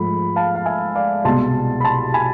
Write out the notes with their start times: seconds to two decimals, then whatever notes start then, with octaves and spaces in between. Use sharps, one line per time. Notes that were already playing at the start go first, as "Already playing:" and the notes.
Already playing: G#2 F3 A3 B5
0.36 F5 A5
0.56 F5
0.66 E5 G#5
0.95 D5 F5
1.24 C2 B2 G#3 B3 A5 C6
1.80 B5
1.84 A5 C6
2.14 G#5 B5